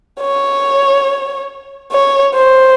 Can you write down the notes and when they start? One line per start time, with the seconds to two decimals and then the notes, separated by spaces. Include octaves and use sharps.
0.20 C#5
1.92 C#5
2.34 C5